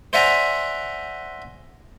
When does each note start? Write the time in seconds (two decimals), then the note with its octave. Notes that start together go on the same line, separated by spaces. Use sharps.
0.13 C5 D5 E5 F#5 G#5 A#5